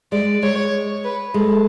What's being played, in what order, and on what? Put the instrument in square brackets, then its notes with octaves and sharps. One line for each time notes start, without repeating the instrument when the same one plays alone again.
[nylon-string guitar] G#3 [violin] D5
[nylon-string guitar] G#3 [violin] C#5
[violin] B4
[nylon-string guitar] G#3 [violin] A4